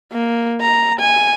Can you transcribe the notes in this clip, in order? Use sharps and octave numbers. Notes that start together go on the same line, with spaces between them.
A#3
A#5
G#5